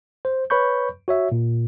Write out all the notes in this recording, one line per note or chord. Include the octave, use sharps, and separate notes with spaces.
C5
B4 C#5 B5 C#6 G6
F#4 C#5 E5
A#2